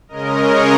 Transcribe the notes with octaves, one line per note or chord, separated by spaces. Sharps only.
C#3 G#3 C#4 A#4 D#5
G#4 C#5